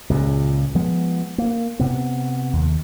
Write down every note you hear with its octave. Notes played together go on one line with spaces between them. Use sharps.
C#2 A#2 C#3
F3 G#3 B3
A#3
C3 B3
D#2